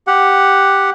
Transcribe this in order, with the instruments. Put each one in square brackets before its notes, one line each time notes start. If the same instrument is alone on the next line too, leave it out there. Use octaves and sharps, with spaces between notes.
[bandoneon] G4 F#5